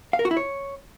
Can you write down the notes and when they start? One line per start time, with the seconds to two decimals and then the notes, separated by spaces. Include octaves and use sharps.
0.13 F5
0.19 A#4
0.25 F#4
0.31 E4
0.37 C#5